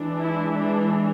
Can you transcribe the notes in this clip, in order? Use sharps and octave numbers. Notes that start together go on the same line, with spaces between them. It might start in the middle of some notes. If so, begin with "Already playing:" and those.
Already playing: E3 G#3 D4
E4
D4